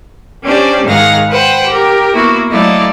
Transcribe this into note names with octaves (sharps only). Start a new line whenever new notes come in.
C#4 D4 G4 C5 D5
G#2 D#3 G#4 F5 F#5 A#6
B4 C5 F#5 G5
G4 A#4
A#3 B3 E4 F#4
F#3 A3 E4 D5 D#5 F5